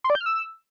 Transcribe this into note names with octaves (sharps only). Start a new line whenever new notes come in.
C6
D5
G6
F6
E6